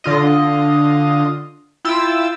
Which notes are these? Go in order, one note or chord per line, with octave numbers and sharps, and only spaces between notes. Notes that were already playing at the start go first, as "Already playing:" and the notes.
D3 F4 D#5
E4 F4 G5 E6 A6